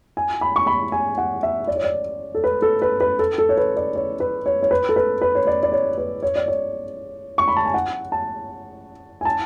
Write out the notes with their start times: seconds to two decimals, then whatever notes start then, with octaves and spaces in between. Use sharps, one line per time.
0.17 G#5
0.41 B5
0.56 C#6
0.67 B5
0.92 G#5
1.18 F#5
1.43 E5
1.67 D5
1.76 C#5
1.84 D5
2.35 A4
2.44 B4
2.62 A4
2.82 B4
3.00 B4
3.19 A4
3.38 A4
3.49 C#5
3.57 B4
3.76 D5
3.96 C#5
4.20 B4
4.46 C#5
4.63 C#5
4.71 B4
4.89 A4
4.96 B4
5.21 B4
5.35 C#5
5.47 D5
5.63 D5
5.72 C#5
5.98 B4
6.23 C#5
6.36 D5
6.48 C#5
7.38 C#6
7.48 B5
7.56 A5
7.65 G#5
7.74 F#5
8.12 A5
9.21 G#5
9.25 A5